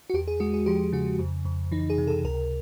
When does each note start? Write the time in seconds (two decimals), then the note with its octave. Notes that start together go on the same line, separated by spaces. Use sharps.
0.10 F#4
0.14 E2 G4
0.28 G#4
0.40 G#3 F#4
0.54 G#4
0.66 F3 G4
0.92 C#3 F#4
1.19 F2
1.45 F2
1.71 E3 D#4
1.90 G#4
1.98 C3
2.07 A4
2.24 C#2 A#4